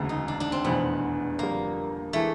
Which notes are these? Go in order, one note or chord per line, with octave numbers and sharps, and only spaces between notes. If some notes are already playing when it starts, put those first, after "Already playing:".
Already playing: E1 D2 C#3
D#4
D4
D4
C4
F1 E2 B2 B3
F2 D3 G3 A#3
E3 G#3 A3